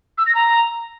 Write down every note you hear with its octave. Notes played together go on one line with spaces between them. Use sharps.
E6
A#6
A#5